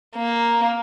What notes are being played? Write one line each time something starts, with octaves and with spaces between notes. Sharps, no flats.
A#3